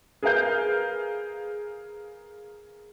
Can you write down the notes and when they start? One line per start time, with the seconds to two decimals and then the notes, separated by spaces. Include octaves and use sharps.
0.23 G#4 A#4 B4 F5 G6